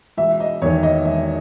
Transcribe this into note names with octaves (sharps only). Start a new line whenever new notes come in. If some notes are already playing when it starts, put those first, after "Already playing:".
E1 E5
D#5
E2 D#3 C#5
D#5
E1 E5